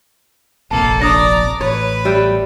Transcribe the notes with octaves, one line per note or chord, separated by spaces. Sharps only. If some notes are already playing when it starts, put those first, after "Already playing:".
F1 A#1 F2 A#3 A4 A5
D4 D5 A#5 D#6 A#6
A1 B4 C#5
G3 E5 G5